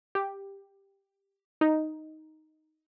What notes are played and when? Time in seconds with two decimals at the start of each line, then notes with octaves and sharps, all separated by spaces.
0.15 G4
1.61 D#4